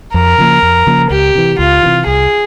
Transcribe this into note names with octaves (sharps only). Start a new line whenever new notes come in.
F2 A#4
C#3 F3 A#3
F2
C#3 F3 A#3
C#2 G4
C3 E3
C#2 F4
C3 E3
C2 G#4